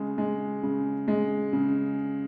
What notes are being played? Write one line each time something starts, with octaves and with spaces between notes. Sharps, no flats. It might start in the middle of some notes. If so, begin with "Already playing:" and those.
Already playing: C#3 G#3
G#3
C#3
G#3
C#3